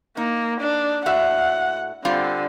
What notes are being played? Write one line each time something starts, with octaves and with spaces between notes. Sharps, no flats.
A#3 D#4
D4
A2 F#4 E5 F#5
D3 G3 C4 F4